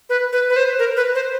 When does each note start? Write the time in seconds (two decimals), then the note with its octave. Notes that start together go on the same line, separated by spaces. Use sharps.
0.09 B4
0.33 B4
0.50 B4
0.56 C5
0.79 A#4
0.97 B4
1.15 C5